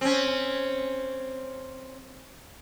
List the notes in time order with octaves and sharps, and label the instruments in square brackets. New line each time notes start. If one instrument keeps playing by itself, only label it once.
[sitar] C4 C#4